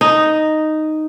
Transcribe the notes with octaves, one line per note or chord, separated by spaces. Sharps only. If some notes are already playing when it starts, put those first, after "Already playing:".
D#4